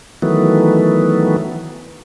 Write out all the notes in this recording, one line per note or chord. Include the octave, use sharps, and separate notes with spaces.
D#3 E3 F#3 A3 B3